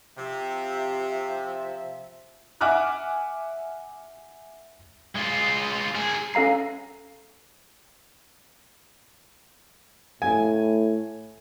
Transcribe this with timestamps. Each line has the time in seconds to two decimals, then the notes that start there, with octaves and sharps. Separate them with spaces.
0.17 C3 F3 E5
2.61 E5 F#5 G#5 D6 F6 F#6
5.15 G#3 F4
5.95 G#4 A#4
6.34 C#4 A4 F5 A#5 C7
10.22 A2 G#5